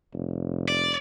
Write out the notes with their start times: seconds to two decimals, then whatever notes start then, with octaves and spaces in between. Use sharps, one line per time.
0.13 F1
0.68 D5